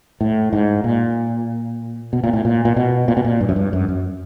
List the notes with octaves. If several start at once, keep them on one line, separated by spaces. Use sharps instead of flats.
A2
G#2
A#2
B2
A#2
A2
A#2
A#2
B2
A#2
B2
A#2
G2
F#2
G2
F#2
F#2